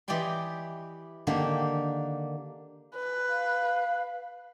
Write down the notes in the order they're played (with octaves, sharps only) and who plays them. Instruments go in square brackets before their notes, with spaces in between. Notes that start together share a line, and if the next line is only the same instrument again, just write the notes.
[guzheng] E3 G4 D5 D#5 G5 C6
D3 D#3 A#3 G4
[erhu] B4
[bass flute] F5